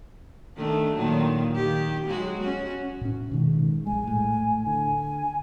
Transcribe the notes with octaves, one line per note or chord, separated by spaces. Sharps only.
D#3 A3 D4
A#2 D#3 F#3
D#3 G4
F#3 G#3 F#4
C#4 F#4
A2 C#4
B2 D#3 G#3
A#1 G#3 G#5
A2
D3 G#5